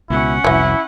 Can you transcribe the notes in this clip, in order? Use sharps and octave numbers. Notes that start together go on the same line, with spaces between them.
C#2 B2 C#4 E4 F#5
F1 C2 E3 F#3 E4